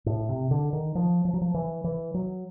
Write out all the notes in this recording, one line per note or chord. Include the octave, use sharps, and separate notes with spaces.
A2
C3
D3
D#3
F3
F3
F#3
F3
E3
E3
F#3